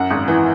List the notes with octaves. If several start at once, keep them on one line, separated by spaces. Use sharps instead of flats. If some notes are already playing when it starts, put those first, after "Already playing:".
Already playing: F#2 F#5
G#1
E3